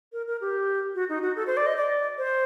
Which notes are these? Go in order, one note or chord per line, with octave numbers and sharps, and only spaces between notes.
A#4
A#4
G4
F#4
D#4
F#4
A4
C5
D5
D#5
D5
C5